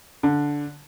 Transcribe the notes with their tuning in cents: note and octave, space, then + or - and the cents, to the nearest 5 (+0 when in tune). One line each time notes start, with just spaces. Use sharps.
D3 -15